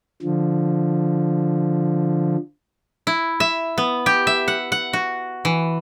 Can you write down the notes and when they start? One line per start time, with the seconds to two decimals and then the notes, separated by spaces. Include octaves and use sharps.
0.22 D3 F3
3.07 E4
3.40 E5
3.78 B3
4.06 G4
4.27 E5
4.48 F#5
4.72 F#5
4.93 F#4
5.45 E3